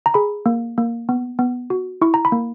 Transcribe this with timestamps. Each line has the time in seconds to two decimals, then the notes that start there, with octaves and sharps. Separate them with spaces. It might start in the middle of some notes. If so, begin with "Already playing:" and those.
0.06 A#5
0.14 G#4 B5
0.46 A#3
0.78 A#3
1.09 B3
1.39 B3
1.70 F#4
2.01 E4 C#6
2.14 A#5
2.25 B5
2.32 A#3